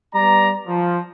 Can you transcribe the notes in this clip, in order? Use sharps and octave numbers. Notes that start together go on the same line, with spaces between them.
G3 B3 D5 A#5
F3